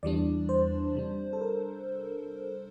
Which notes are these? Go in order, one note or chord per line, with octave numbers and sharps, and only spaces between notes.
E2 E3 G3 D4 D5
C5
C3 G3 D4
A4
A#4